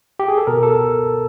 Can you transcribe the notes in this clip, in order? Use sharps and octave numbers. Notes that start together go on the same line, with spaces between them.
G4
G#4
A4
B2 A#4
A4